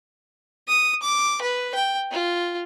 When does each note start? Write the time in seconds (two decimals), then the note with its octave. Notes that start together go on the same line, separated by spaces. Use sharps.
0.68 D#6
1.02 D6
1.41 B4
1.74 G5
2.11 F4